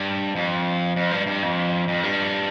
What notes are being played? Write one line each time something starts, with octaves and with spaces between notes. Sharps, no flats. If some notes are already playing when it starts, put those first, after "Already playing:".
Already playing: G2
F2
F2
G2
G2
F2
F2
G2